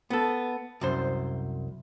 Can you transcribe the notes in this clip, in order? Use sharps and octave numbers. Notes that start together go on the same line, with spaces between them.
B3 A4
C2 F#2 C5